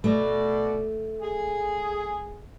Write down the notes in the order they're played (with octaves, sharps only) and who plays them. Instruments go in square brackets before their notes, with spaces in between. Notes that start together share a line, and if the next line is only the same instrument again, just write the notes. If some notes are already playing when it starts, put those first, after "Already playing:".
[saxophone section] B2 D5 [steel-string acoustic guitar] A3
[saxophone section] G#4